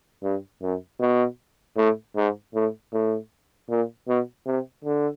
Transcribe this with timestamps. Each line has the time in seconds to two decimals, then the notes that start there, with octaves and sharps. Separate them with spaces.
0.24 G2
0.62 F#2
1.01 B2
1.77 A2
2.16 G#2
2.55 A2
2.93 A2
3.70 A#2
4.08 B2
4.46 C3
4.84 D3